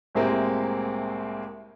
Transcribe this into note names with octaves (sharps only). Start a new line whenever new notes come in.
C2 A2 C3 G#3 A#3 C4